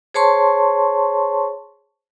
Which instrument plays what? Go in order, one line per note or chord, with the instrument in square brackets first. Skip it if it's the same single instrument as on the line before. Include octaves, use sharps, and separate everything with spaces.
[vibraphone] G#4 C5 C#5 A5 C6 C#6